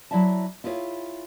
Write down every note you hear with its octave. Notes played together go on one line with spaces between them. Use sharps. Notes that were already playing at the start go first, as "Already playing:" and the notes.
F#3 E4 D5 E5 A5
E4 F4 G#4 A#4 C#5